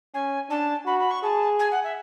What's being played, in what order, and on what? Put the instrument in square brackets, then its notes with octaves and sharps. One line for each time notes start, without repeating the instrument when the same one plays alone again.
[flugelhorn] C#4 [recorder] G#5
[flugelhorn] D4 [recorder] A5
[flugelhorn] F#4 [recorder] B5
[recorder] B5
C#6
[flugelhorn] G#4 [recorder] A5
[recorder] G#5
F#5
E5